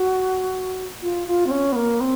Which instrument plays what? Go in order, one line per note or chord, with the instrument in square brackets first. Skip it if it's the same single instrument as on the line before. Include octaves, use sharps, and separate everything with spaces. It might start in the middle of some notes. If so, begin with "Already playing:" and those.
Already playing: [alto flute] F#4
F4
F4
C4
C#4
B3
A#3
C4